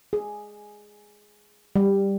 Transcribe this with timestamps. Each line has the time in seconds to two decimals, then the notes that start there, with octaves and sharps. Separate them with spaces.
0.13 G#4
1.76 G3